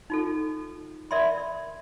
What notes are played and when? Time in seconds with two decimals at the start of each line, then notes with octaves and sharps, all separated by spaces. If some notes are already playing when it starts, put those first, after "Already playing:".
0.10 D#4 F4 A4
1.11 A#4 D5 E5 B5 C6